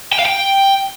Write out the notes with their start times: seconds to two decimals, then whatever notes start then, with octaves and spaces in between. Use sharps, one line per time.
0.13 G5
0.19 F5
0.26 G5